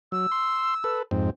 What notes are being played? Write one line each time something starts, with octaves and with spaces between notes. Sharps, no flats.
F#3 E6
C6
A4 B4
F2 G#2 C4